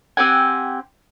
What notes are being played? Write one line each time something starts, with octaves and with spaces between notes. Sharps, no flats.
C4 G4 F#5 G#5